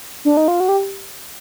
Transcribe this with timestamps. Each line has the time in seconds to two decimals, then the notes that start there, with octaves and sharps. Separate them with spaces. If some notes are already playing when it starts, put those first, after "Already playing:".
0.25 D4
0.37 D#4
0.48 F4
0.60 F#4
0.68 G4